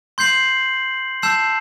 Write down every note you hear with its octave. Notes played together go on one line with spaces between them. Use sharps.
C6 G6 C7 F#7
A5 E6 G6 C7 E7